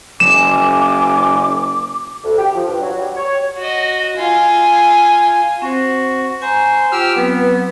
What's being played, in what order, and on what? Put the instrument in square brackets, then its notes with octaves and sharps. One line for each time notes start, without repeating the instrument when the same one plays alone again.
[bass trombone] F#1 [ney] G#5 [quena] D6 [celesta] E7
[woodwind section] D2
G4
F3
G2
F#3
G3
C#5
[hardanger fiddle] F#4 D#5
F4 G#5
[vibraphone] C4 C5 [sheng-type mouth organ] F#4
[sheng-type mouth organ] C5 [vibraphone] G#5 A#5 C#6
[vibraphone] F4 G5 [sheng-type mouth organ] G4 E6 F6
[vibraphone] F#3 C4 B4 [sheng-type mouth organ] B3